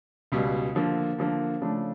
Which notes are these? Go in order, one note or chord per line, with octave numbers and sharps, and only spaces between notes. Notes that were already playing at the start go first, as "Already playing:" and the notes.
C#2 B2 G3
D3 F3 A#3
D3 F3 A#3
C#3 F3 A3 D4